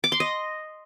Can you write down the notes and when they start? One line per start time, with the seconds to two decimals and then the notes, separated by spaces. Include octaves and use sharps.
0.04 D6
0.12 C6
0.20 D#5